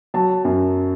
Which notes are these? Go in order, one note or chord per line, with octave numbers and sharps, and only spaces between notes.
F#3 A5
F#2